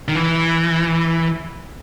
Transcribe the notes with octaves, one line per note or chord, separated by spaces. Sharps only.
D#3
E3